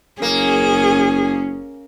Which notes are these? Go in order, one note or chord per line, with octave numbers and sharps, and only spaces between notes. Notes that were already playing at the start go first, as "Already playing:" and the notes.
F#1 A#3 C#4 G#4